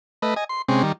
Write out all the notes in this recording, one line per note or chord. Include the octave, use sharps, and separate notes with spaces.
A3 B4 D#5
D#5 G#5
C6
C3 G#3 C4 C#4
D#3 G3